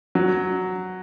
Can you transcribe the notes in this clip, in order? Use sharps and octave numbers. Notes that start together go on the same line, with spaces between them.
F#3